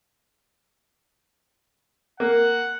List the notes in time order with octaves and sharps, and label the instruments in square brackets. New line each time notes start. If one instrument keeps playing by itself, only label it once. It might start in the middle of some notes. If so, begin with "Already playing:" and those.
[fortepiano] A#3 [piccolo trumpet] F#5